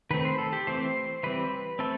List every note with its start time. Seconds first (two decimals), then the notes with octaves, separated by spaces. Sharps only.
0.11 D#3 A3 C4 B4
0.25 C5
0.38 A4
0.53 G4
0.67 E3 A3 C4 C5
1.23 E3 G3 C4 B4
1.79 A3 C4 A4